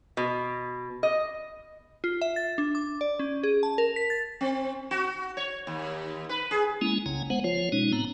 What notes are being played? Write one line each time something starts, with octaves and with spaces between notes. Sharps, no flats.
B2
D#5
F4
E5
A6
D4
D6
D5
C#4
G#4
A5
A#4
B6
A6
C4
F#4
C#5
D#2
B4
G#4
G#3 A#3 C#4 E4
F#1 C2 C#3 G#5 A#5
G#3 B3 C5 F#5
F3 F4 C#5
B2 G#3 C#4 D#4
A2 B3 C4 A#5